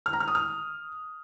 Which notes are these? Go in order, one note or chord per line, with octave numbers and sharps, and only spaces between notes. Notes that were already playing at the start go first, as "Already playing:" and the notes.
F6
A#5
F6
D#6
F6